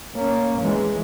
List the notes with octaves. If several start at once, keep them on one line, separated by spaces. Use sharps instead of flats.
A#3 C#4
E3 G#3